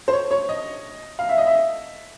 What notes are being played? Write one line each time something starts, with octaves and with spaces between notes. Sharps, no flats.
C5
C#5
C#5
D#5
F5
E5
D#5
E5